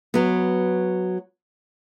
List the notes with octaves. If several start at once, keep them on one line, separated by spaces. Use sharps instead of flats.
F#3 B3